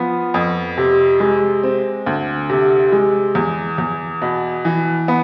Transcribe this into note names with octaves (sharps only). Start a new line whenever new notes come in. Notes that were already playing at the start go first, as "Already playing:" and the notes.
Already playing: F3 B3
F2
C3
G#3
C4
D2
C3
G#3
E2
E2
B2
E3
B3